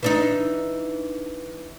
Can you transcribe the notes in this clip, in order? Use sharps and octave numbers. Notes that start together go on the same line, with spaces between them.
E3 D4 D#4